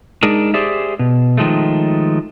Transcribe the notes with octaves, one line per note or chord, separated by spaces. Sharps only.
G#3 D4 D#4 G#4 A#4
G4 G#4 C5 D5 E5
B2
D#3 F3 G#3 A3